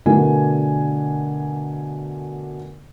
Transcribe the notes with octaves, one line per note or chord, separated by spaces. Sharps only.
B2 D3 A3 D4 A#4 G#5